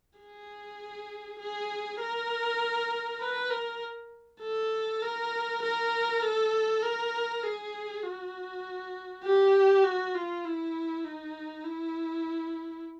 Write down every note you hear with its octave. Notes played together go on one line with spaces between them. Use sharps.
G#4
G#4
A#4
B4
A#4
A4
A#4
A#4
A4
A#4
G#4
F#4
G4
F#4
F4
E4
D#4
E4